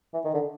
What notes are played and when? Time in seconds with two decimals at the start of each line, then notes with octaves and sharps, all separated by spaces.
0.14 E3
0.25 D#3
0.34 D3